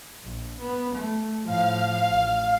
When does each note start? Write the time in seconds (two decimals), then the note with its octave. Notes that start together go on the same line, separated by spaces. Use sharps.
0.22 A#1
0.60 B3
0.95 A3
1.46 A2 F3 F5
2.11 A1